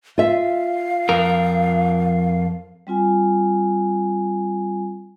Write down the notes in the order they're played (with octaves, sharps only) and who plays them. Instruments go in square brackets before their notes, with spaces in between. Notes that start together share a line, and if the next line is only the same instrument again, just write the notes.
[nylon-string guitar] F4 E5 [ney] F5
[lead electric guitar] F2 A#4
[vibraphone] G3 C4 F4 G#5